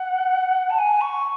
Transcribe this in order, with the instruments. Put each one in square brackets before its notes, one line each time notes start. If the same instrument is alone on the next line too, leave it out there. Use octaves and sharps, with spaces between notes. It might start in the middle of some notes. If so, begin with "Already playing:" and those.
Already playing: [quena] F#5
A5
G#5
C#6